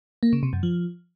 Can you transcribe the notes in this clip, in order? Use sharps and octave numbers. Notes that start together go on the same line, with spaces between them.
A#3
C#3
C3
F#2
F3